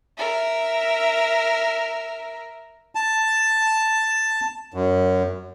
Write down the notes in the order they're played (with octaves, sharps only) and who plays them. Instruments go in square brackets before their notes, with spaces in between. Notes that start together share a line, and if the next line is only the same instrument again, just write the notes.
[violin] A#4 E5
[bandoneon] A5
F#2